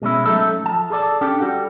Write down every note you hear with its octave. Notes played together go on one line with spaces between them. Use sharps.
B2 G#3 C#4 E4
F#3 A3 C#4 D#4 A4 E5
F3 A5
G#4 A4 C5 D5 A5
C#4 D4 G4 A4
G3 F#4 A4 F#5